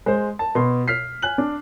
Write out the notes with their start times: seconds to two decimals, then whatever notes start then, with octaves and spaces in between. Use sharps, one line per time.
0.06 G#3 C5
0.39 A5
0.55 B2 C6
0.88 F6 B6 C7
1.22 G#5 F#6 F#7
1.38 D4